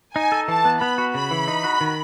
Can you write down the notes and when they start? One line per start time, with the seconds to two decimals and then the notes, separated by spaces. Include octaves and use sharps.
0.15 D#4 G#5
0.32 A4
0.48 E3 A5
0.65 B3
0.81 B3 B5
0.98 F#4
1.14 C#3 B5
1.31 E3
1.48 D#4
1.64 F#4
1.81 D#3